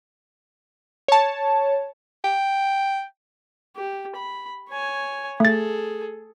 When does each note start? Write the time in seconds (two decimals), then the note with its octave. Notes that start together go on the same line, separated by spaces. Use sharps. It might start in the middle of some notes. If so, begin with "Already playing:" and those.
1.08 C#5 A5
2.24 G5
3.76 G4
4.15 B5
4.69 C#5 G#5
5.40 A3 G#4 A4 A6